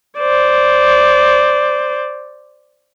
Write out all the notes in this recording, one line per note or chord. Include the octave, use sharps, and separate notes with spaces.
C5 D5